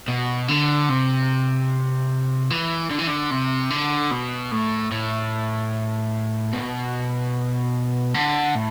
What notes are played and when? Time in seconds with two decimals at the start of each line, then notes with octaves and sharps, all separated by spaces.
0.08 B2
0.48 D3
0.89 C3
2.50 E3
2.90 D3
2.99 E3
3.07 D3
3.31 C3
3.70 D3
4.11 B2
4.51 A2
4.92 A2
6.53 B2
8.14 D3
8.55 A2